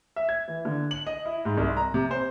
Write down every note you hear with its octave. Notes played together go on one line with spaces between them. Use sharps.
E5
G#6
E3
D3
F#7
D#5
E4
G#2
C2
A#5
C3
C5